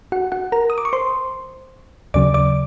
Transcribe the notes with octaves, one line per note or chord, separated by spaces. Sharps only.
F#4 F#5
F#4 F#5
A#4 A#5
D#6
D6
C#6
C5 C6
D#2 C#3 F#3 D5 D6
D5 D6